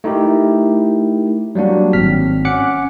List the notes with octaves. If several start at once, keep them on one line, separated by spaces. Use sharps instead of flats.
A3 D#4 E4 G4 A#4
F#3 G3 A#3 D4 F#4
G#1 C4 F6 B6
C#4 F#5 D6 F#6 C#7